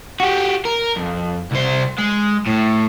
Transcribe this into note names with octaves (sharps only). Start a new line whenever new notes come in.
F#4 G4
A#4
F2
C2 C5
G#3
A2